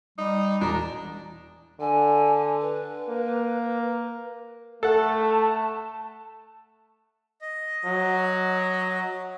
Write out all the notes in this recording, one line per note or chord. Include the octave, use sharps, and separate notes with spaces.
G3 D#4
E1 D4 A#5
D3 G#5
B4
A#3
A3 A4 F#5 A5
D#5
F#3